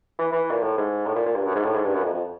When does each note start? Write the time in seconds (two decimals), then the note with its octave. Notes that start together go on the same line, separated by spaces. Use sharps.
0.19 E3
0.32 E3
0.51 A#2
0.63 A2
0.77 G#2
1.06 A2
1.15 A#2
1.26 A#2
1.35 G2
1.46 F#2
1.55 G#2
1.64 A2
1.74 G#2
1.85 G2
1.94 F#2
2.04 F2
2.14 F2